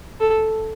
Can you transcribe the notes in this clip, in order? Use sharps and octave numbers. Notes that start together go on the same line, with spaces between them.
A4